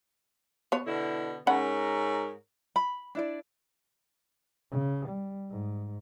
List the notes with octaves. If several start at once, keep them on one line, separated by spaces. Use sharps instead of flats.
B3 C#5
B2 D3 E4
G#2 C#4 A#4 C#5 F#5 B5
B5
D4 E4 D5
C#3
G3
G#2